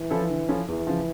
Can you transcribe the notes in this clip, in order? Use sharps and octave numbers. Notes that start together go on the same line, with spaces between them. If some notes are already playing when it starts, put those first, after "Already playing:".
Already playing: E3
F3 C#4 E4 A4
D3
F3 C#4 E4 A4
E2 E3
C#3 F3